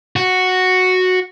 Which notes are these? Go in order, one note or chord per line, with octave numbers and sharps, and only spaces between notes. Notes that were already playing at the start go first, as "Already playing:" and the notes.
F#4